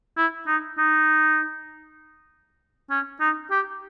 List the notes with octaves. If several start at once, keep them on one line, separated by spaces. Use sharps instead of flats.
E4
D#4
D#4
C#4
D#4
G4